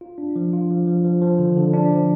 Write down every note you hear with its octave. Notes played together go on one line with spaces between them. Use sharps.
F4
D4
F3
F4
F3
F3
F3
F3
D3
D3
D4
F3